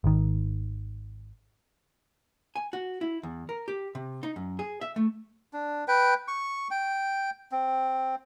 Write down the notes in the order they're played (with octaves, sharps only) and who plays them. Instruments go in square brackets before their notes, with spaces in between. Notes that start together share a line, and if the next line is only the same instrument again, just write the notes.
[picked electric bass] G#1 D#3
[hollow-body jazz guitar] G#5
F#4
E4
E2
A#4
G4
C3
D#4
F#2
G#4
E5
A3
[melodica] D4
B4 G5
C#6
G5
C4